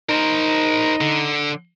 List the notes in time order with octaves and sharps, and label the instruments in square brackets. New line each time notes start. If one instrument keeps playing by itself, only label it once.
[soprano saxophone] D#4 [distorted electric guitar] A#4 C5
[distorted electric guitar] D3